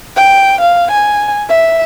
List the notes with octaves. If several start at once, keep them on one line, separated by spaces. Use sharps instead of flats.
G5
F5
G#5
E5